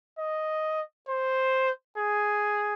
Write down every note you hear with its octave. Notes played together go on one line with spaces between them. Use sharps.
D#5
C5
G#4